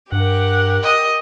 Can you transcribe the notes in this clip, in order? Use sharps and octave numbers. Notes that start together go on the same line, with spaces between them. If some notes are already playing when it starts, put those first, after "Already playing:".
G2 G4 A#4 F#5
D#5